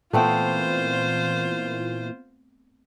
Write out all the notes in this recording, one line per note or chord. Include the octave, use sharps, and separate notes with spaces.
A#2 E3 A3 B3 C4 F4 C5